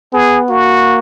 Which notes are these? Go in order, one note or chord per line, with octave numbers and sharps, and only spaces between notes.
B3 G#4
A#3 F#4